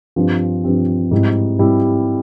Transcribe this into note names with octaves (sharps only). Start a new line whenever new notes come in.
G2 F3 C4 G4
G2 F3 C4 G4
G#2 G3 C4 E4
G#2 G3 C4 E4